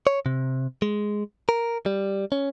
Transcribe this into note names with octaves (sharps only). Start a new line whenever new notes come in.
C#5
C3
G#3
A#4
G3
C#4